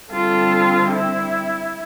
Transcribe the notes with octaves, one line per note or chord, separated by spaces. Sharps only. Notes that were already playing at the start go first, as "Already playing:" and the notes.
D3 G3 C4 F4 A4
E4